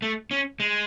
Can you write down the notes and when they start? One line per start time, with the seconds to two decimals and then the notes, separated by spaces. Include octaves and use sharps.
0.02 A3
0.31 C#4
0.60 G#3